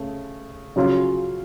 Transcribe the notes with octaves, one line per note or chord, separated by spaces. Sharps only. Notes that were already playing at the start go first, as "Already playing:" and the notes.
Already playing: C#3 A3
C#3 F#3 C#4 F4